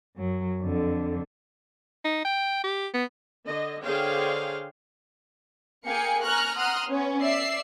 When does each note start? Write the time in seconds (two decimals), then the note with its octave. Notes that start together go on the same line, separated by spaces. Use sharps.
0.17 F#2 F#3
0.62 F2 D3
2.04 D#4
2.25 G5
2.64 G4
2.94 B3
3.46 D3 D#5
3.84 D3 G#4 C5 C#5 F5 G5
5.86 A#3 G#4 F5 G5 G#5 C#7
6.23 G#5 A#5 C#6 F6 F#6
6.55 F#5 A#5 C6 D#6 F6 F#6
6.88 B3 C#4 C#5
7.22 D5 E5 E6 C7